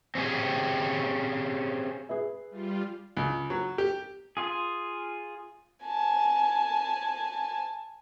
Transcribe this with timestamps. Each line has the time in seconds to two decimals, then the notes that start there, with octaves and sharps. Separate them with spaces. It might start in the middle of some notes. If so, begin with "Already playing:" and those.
0.15 C4 C#4 G4 G#4
2.09 G#4 B4 E5
2.50 G3 F4
3.17 C#2
3.50 F#3
3.78 G4
4.37 F4 G#4
5.86 G#5 A5